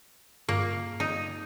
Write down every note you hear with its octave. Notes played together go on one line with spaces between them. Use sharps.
G2 A#3
D#4